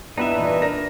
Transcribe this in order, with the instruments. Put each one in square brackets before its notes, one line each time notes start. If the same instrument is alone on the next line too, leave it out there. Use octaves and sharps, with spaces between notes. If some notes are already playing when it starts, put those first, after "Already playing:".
[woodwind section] G2 [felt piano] B3 E4 [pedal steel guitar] D#4 B4 E5
[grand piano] E2 [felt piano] A#2
[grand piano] D4 A#4 [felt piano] A#6